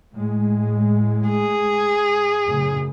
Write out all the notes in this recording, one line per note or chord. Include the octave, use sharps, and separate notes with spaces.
A2 G#3
G#4
F#2 A2 C#3